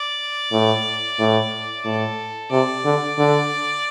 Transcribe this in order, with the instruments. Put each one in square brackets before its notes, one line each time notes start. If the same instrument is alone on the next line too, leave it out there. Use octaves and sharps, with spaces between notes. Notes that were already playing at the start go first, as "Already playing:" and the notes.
Already playing: [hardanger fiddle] D5
[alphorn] A2
A2
[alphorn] A2 [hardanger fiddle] A4
[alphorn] C3 [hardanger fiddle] D5
[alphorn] D3
D3